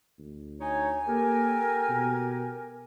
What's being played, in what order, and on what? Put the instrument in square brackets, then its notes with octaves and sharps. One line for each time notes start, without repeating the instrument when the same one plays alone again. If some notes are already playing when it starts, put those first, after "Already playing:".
[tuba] D2
[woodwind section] D#4 C#5 [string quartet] G#5
[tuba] A#3 [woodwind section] G4 A4 A#4
[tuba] B2